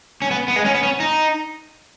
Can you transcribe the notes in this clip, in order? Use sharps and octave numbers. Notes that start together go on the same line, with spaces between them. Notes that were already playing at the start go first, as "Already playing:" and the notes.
C#4
B3
B3
G#3
C#4
B3
C#4
D#4